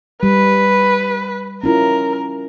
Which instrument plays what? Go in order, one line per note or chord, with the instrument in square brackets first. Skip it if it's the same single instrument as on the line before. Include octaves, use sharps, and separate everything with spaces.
[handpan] G3 [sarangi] B4
[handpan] C#4 E4 F4 [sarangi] A#4